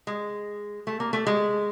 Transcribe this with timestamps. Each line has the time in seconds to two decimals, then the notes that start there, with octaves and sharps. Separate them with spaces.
0.07 G#3
0.87 A3
1.00 A#3
1.13 A3
1.27 G#3